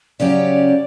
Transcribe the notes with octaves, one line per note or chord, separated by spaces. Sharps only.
C#3 F#3 C#4 G4 D5